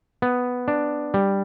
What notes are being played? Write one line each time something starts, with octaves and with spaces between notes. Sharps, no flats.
B3
D4
G3